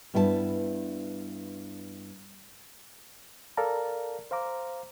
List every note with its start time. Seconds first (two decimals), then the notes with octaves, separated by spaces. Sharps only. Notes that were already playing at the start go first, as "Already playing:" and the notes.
0.14 G2 B3 E4 G4 A5
3.57 A4 A#4 D5 F5 A5 A#5
4.31 C5 F5 A#5 D6